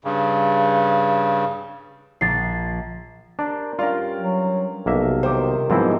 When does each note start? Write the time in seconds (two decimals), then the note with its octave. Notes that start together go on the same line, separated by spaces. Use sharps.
0.05 G2 C#3
2.21 A#1 A6 C7
3.39 D4 A#4 C5 D5
3.79 G2 C#4 F4 A#4 D5 F5 G5
4.19 F#3
4.86 B1 C3 A#3 E5
5.23 D#3 C4 F4 C5 D6
5.70 G#2 F3 F#3 B3 C4 E4 G4